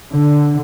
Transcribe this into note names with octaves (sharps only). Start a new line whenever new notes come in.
D3